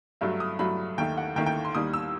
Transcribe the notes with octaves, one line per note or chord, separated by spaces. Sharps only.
G2 F#3 A3 E5
D#6
G2 F#3 A3 B5
D#2 D#3 A3 G5
F#5
D#2 D#3 A3 G5
G5
C6
D#2 D#3 G3 D#6
E6